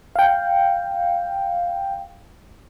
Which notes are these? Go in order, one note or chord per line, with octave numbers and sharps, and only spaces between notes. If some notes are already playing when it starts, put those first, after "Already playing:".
F5 G5